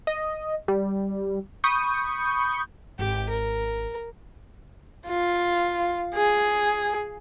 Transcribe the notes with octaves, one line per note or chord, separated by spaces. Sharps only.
D#5
G3
B5 C#6 D#6 G6
G#1 G4
A#4
F4
G#4